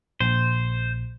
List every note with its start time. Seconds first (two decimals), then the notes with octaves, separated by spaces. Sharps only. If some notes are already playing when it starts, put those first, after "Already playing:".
0.20 A#1 C5